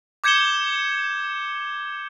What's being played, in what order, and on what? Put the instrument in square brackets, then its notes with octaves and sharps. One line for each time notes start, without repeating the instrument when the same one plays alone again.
[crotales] D6 G6 G#6 C#7 E7 G7